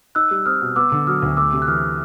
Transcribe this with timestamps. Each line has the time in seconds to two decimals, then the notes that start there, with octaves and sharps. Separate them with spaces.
0.15 D#4 E6 F#6
0.31 G3
0.46 C4 D#6 F6
0.61 B2
0.76 B3 D6 E6
0.92 D3
1.07 F#3 D#6 F6
1.22 D2
1.37 A3 D6 E6
1.53 C3
1.62 F#6
1.67 E3 D#6 F6